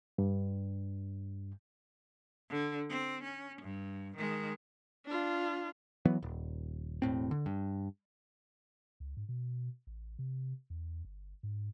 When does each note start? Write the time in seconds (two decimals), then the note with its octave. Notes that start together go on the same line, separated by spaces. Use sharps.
0.18 G2
2.50 D3
2.90 C4
3.24 C#4
3.62 G2
4.17 D#3 G#3
5.06 D4 F4
6.05 E3 F#3 B3
6.22 D#1
7.02 E1 A2 C4
7.31 D3
7.46 G2
9.00 C#2
9.17 G#2
9.29 B2
9.87 A1
10.19 C3
10.70 E2
11.05 G1
11.43 G#2